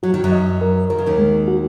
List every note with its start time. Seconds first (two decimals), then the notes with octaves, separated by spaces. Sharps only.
0.03 F#3 F#4
0.14 D#3
0.24 F#2 F#3
0.32 D#5
0.61 A#4
0.90 D#3 A#4
0.99 C#3
1.06 D#2 D#3
1.19 G#3
1.48 F#4